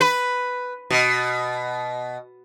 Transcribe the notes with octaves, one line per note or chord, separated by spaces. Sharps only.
B4
B2